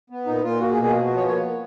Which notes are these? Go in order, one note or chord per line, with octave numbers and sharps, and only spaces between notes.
B3
A#2 D#4
A#2 F4
A#3 F#4
G#4
B2
G#4
F3 F#4
F#4
B3
C#5
A#3 C#5
A#3